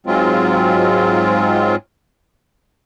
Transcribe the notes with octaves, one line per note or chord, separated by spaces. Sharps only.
G#2 F#3 G#3 C4 F4